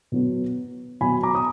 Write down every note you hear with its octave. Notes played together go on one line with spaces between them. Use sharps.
B2 F#3 B3
B2 F#3 B3 G#5 B5
A#5 D6
D#6